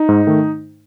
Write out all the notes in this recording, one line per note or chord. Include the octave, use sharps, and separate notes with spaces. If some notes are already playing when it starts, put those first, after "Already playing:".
Already playing: D#4
G#2
D#3 A3